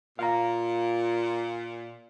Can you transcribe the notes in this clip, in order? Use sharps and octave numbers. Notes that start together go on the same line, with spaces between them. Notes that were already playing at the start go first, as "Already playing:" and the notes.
A#2 F5 A#5